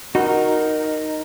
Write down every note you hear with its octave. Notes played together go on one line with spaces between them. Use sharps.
D#4 F#4 A#4